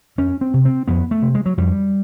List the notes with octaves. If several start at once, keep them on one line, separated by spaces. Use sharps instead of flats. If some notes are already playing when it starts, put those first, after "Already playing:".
F2 C#4
C4
C3
C4
F2 B3
A3
C3
G#3
F#3
F2 G3